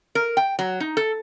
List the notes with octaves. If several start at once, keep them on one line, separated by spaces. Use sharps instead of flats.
A#4
G5
F#3
D#4
A4